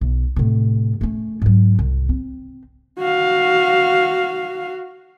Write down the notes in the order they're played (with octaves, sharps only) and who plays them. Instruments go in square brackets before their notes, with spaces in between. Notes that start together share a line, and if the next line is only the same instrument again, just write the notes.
[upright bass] B1
A2 C3
A3 C#4
G#2 F#3
C2
C4
[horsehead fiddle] F#4 F5